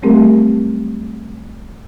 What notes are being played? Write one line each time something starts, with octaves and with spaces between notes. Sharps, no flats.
F#3 G3 A3 C4 G4 A#4